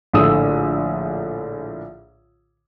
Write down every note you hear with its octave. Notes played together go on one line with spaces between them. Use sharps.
A#1 A2 D3 D#6 E6